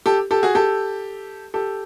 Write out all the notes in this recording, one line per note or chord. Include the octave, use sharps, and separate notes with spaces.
G4 A4
G4 A4
F#4 G#4
G4 A4
G4 A4